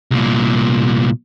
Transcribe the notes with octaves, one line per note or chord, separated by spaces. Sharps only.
C2 A#2